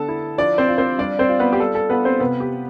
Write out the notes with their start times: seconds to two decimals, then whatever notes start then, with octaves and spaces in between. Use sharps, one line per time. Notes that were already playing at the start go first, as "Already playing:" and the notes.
Already playing: D3 B3 A4 A5
0.08 E4
0.38 F3 D4 D5
0.58 C4 C5
0.68 F4
0.78 C4 C5
0.99 G3 D4 D5
1.19 C4 C5
1.29 F4
1.39 B3 B4
1.53 G4
1.60 G3 A4
1.75 A4
1.90 B3 F4 B4
2.05 C4 C5
2.20 C3 B3 B4
2.40 G4